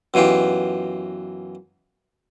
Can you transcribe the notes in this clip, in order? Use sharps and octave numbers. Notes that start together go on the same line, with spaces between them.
F#2 B2 E3 F4 G4